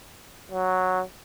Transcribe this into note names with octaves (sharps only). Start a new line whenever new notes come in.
F#3